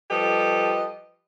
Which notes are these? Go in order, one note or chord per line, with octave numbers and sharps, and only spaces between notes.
F3 G3 G4 A4 B4 D#5